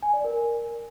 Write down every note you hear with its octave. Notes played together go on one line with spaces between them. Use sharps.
G#5
D5
A#4